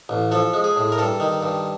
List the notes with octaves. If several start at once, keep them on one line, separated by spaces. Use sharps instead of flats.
A1
F3 A4
G#3
G#4
A2
A#4
G2 A4
D#3
G2